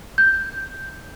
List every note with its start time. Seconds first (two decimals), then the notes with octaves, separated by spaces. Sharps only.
0.18 G6